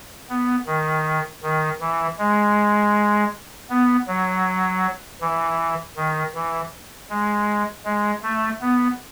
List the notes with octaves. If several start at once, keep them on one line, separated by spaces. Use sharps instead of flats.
B3
D#3
D#3
E3
G#3
B3
F#3
E3
D#3
E3
G#3
G#3
A3
B3